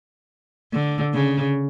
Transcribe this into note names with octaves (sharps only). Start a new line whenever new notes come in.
D3
C#3